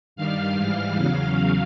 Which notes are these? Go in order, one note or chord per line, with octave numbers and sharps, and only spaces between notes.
G2 D#3 G3 F5 F6
G#2 E3 G3
E2 C#3 F#3 F5 F6